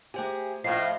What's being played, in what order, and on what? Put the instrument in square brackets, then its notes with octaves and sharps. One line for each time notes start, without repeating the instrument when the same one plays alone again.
[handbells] A3 C5 G#5 [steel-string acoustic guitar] G4 G#4
[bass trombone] A2 [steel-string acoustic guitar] F3 A3 F4 [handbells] D#5 [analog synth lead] C7